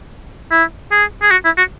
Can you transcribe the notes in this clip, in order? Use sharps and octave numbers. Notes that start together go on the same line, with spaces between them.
E4
G#4
G#4
F#4
E4
F#4